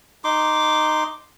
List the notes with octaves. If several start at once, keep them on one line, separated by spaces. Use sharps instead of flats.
D#4 C6 D6